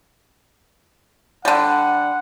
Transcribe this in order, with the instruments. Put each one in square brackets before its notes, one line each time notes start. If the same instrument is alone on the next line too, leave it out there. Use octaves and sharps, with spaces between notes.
[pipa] D3 G3 [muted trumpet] F#5